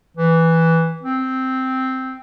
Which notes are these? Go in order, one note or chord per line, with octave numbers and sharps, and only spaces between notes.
E3
C4